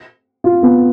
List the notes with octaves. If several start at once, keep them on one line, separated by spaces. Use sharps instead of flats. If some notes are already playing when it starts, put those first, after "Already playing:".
F4
B3